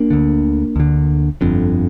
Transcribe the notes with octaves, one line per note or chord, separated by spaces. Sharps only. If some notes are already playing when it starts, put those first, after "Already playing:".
Already playing: A#3 D4
D2 D3
D2 D3
G1 F2 D3